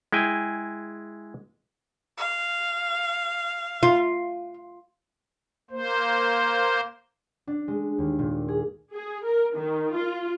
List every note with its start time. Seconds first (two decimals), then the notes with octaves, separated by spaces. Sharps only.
0.12 G#3 E4 G5 G#5
2.18 F5
3.83 F4
5.71 A#3 C5
7.47 D4
7.68 G#3
7.98 D#2
8.19 A#2
8.48 G#4
8.93 G#4
9.24 A#4
9.54 D#3
9.95 F4